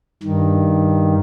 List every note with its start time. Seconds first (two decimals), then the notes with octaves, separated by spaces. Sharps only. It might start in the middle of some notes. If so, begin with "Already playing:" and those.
0.23 G2 D#3